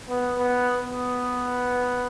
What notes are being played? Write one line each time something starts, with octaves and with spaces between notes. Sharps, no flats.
B3
B3
B3